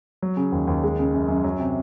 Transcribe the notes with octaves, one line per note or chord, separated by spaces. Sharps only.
F#3
C#3
D#2
D#2
G#3
C#3
F#2
F#2
F#3
C3